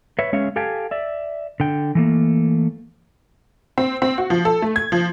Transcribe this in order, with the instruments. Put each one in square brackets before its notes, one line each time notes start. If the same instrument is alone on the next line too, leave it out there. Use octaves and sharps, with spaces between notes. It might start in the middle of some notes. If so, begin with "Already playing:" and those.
[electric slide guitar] B4 C#5 E5
G#3 C#4 C#5 E5 F5
G4 A4 F5 G5 G#5
D5 E5
D3 G5
E3 A3 A#3
[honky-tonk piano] C4
C4
F#4
F3
A4
A3
G#6
F3